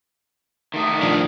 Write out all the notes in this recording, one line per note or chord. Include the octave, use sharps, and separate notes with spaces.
D#3 A3 D#4
F3 D4